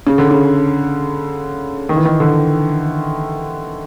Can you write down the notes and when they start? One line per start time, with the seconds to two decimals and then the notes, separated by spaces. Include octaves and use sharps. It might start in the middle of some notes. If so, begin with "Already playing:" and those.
0.07 C#3
0.18 D3
0.31 C#3
1.89 D#3
1.96 E3
2.05 D#3
2.20 D3